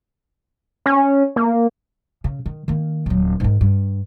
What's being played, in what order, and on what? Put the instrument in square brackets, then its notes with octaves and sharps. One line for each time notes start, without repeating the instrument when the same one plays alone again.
[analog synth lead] C#4
A#3
[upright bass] C#3
D#3
D#3 A#3
D#1 F#3
G#2 D#3
G2